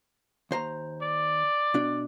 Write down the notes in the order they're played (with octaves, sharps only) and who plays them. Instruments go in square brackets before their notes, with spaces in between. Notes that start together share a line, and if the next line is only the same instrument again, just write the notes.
[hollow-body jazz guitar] D#2 C5 A#5
[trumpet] D5
[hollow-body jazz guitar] B2 D4